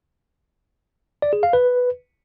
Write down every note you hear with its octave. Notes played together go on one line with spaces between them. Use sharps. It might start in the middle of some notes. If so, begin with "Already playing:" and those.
D5
G#4
F5
B4